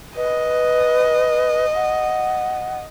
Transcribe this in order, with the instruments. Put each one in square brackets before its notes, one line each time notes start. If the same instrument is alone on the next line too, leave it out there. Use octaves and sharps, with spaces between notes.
[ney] B4 [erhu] D#5
[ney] F#5